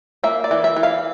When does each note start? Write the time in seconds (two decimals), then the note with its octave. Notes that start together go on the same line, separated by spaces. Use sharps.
0.24 A#3 E5
0.44 D5
0.51 E3
0.64 E5
0.77 E3
0.83 F5